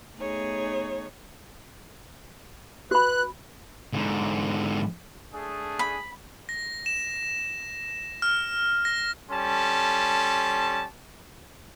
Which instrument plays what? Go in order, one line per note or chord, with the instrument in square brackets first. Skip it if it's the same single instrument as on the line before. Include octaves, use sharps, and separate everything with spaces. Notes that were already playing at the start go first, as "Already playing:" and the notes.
[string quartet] A3 B3 D#4 G#4 C#5
[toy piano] F#4 B5 [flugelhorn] B4 [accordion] F#6
[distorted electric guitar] G#2 D3
[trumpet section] A3 D4 G#4
[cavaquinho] B5
[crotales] A#6
E7
F6
A#6
[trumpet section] G3 C#4 A4 A5 C6